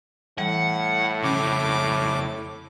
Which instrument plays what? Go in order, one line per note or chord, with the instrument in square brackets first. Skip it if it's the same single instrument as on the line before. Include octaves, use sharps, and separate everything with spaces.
[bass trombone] A2 [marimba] E3 G3 [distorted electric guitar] F#5
[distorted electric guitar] F2 C#3 [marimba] C#4 [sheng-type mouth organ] D6